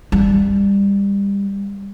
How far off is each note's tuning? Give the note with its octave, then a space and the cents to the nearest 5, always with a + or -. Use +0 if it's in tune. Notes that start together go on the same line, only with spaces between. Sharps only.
G3 +25